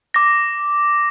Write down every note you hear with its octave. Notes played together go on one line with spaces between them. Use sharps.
D6 A#6